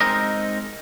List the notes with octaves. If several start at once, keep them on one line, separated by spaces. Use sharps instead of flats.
G#3 C4 D#4 A#4 D#5